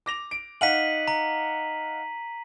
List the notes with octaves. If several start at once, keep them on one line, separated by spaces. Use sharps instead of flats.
D6 A#6 F7
D7
D#4 F5 F#5 B6 D#7 F#7
A#5